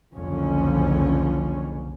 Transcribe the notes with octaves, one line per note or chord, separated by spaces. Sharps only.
F#1 C2 F2 D3 F3 C#4